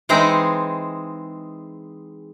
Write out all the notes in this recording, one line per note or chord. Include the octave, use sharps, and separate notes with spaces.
E3 G#3 C4 D#4 G#4